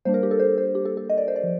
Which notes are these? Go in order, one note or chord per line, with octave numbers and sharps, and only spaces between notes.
G3 A#3 D4 C5
A#4
G4
A4
C5
C5
G4
A4
A4
D#5
D5
C5
D5
F3